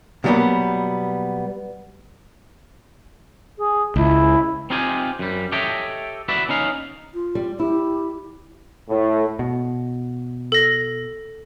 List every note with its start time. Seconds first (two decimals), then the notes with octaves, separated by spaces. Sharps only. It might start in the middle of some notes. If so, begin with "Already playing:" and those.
0.24 B2 F#3 G3 A#3 B3
3.58 G#4
3.96 C#2 E4
4.70 C4 D#4 F4 G4 G#5
5.19 F#2 G3
5.52 G4 A4 C#5 D#5 E5 G5
6.29 F#4 B4 D5 E5
6.49 C#4 D#4 F5
7.14 F4
7.35 G3
7.60 E4 G4
8.89 A2
9.39 B2
10.52 A4 A#6